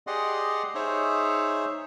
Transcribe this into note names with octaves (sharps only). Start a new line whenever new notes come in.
G4 G#4 D5 D#5 F#5 C6
D#4 G#4 C5 C#5 E5